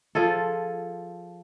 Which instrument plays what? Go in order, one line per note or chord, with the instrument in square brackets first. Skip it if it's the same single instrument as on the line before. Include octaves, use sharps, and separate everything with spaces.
[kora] F3 F4 G#4 A4